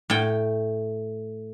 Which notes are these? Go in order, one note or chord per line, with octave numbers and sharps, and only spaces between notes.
A2 G5